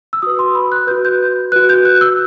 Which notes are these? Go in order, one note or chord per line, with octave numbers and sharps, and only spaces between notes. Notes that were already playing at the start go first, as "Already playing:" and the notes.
E6
F#4 B4 D#6
C6
B5
F#6
F#4 B4 G6
G6
F#4 B4 F#6
G6
F#6
E6